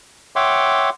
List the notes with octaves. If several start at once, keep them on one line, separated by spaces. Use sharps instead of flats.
C#5 E5 F#5 G5 C6 D6